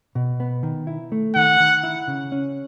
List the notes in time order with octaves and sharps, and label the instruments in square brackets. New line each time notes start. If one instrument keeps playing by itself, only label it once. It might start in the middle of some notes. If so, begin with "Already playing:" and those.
[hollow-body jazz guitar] B2
B3
D#3
E4
A3
[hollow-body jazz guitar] D#3 [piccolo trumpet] F#5
[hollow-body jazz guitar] D#3
E4
C#3
C#4